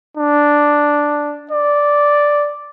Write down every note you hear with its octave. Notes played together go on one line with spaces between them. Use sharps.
D4
D5